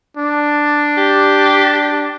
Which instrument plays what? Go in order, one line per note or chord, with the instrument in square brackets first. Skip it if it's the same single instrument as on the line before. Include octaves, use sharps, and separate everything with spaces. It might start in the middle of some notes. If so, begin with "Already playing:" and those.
[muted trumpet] D4
[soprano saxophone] G4